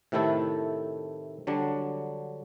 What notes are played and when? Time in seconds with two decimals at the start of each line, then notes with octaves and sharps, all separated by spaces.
0.12 A2 C3 D#3 A3 E4 A4
1.47 D3 F#3 G3 D4